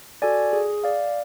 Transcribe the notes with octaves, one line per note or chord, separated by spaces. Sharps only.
F#4 A4 D5 G#5
G#4
D5 F5